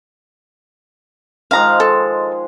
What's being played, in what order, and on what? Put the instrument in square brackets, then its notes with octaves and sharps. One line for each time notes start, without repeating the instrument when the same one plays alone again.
[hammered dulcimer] D#3 F3 G#3 [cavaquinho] F5 A#5
[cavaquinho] A4